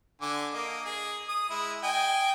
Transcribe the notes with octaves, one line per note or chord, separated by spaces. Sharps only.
D3 G#5 D6
A#3 D#5
G#4
D#6
G#3 E4
D#5 G5 G#5